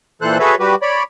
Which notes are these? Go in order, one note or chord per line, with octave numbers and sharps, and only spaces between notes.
A#2 E3 A4 C5 F#6
F#4 G#4 A4 B4 C#5 E5
G3 F#4 G4 B4
C#5 D5 B5